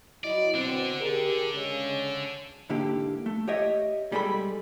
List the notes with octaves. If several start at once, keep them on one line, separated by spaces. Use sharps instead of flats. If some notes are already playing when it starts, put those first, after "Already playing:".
F#3 E4 D5 D#5
B2 D3 C4 D4
G4 G#4 A#4
C#3 G#3 C#4
G#2 D3 A#3 E4 G4
A3
G4 C#5 D#5 E5
B1 G3 G#3 G#4 A4 B5